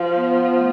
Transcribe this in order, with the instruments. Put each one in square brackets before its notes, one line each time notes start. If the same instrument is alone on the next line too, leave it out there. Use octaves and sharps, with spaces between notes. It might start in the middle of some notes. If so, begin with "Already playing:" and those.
Already playing: [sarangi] F3
[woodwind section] B3
A3